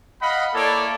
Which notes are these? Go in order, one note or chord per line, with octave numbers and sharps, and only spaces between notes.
D#5 F5 F#5 B5
A#3 E4 A4 C#5 D5